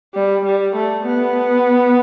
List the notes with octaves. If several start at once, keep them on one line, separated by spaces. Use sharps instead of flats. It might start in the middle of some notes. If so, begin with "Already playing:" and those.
G3
G3
A3
B3